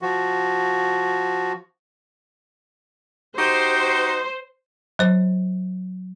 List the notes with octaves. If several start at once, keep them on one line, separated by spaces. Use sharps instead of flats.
F3 F#4
D#4 F#4 G4 C5
F#3 C5